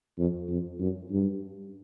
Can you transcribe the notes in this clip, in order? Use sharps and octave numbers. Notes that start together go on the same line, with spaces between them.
F2
F2
F#2
G2